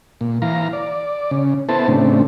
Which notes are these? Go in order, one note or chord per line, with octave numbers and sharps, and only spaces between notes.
A#2
E3 F5 A#5
D5
C#3
B3 E4 A4 C5 A5
A2 C#3 A3 C4 D4